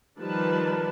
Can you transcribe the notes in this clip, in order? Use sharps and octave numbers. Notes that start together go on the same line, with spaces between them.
D#3 F3 G3 B4 A5